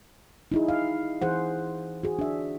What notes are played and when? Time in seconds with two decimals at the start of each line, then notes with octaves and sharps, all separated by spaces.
0.52 D#4 E4 G#4
0.68 F5
1.22 E3 G#4 C5 F#5
2.03 F#4 G#4
2.19 D4 E5